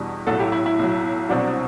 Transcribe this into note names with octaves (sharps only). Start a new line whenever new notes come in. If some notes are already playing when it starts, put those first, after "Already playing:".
Already playing: E2 B2 G3 D4
B1 A2 F#3 F#4 A4
E4 G4
E4
E4
B1 A2 F#3
C2 B2 F#3 C4 D4 F#4